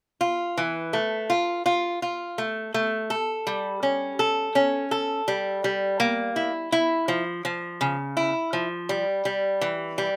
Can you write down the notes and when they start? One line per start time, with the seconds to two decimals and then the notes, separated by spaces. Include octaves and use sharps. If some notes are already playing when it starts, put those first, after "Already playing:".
0.21 F4
0.58 E3
0.93 A3
1.30 F4
1.66 F4
2.02 F4
2.38 A3
2.74 A3
3.10 A4
3.47 G3
3.83 C#4
4.19 A4
4.55 C#4
4.91 A4
5.28 G3
5.64 G3
6.00 A#3
6.36 E4
6.72 E4
7.08 F3
7.45 F3
7.81 C#3
8.17 E4
8.53 F3
8.89 G3
9.25 G3
9.61 E3
9.98 G3